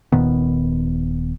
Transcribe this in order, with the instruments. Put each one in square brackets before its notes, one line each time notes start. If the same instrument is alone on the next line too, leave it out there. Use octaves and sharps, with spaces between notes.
[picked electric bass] D#1 A#2 D#3 B3